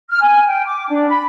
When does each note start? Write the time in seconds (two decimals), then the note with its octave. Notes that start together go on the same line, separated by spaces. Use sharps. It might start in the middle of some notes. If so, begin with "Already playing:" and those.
0.09 F6
0.21 G#5
0.46 G5
0.66 D6
0.87 D4
1.08 B5